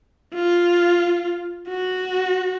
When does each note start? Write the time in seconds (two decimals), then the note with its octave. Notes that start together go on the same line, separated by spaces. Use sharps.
0.35 F4
1.69 F#4